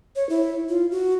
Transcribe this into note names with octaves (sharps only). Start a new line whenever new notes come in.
C#5
E4
F4
F#4